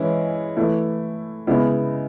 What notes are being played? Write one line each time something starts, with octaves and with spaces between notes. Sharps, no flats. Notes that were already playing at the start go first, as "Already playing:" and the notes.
Already playing: E3 G#3 C#4 E4
E3 A3 E4
C#3 G#3 B3 E4